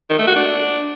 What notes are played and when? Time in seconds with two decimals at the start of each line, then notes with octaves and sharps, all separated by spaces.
0.10 D#3
0.19 A3
0.27 F#4
0.36 D4